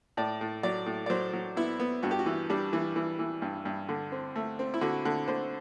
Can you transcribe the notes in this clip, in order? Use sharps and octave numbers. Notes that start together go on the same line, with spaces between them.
A2 D5
A2
F#3 D5
A2
D5
F#3 C5
F#3
B3 E4
B3
G2 F#4
G4
F#4
E3
G3 D4
E3
E3
E3
G2
G2
D3
C4
A3
C4
E4
D3 F#4
D3
D3 C5